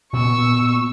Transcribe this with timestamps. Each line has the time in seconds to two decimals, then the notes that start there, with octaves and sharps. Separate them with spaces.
0.13 A#2 B3 C#6 E6